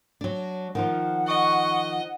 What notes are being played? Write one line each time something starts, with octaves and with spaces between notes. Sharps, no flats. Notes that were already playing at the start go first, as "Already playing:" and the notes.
F#3 D4
D#3 F3 F4 F#5
D#5 C#6